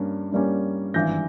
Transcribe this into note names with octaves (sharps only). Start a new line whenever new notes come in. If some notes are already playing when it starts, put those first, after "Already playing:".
Already playing: G2 G3 A#3 C#4
G2 G3 A#3 C#4
G#1 G2 E3 G3 G6 A#6